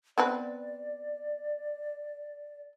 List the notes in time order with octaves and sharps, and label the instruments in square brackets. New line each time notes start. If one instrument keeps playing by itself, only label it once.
[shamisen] B3 C4 B4 [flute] D5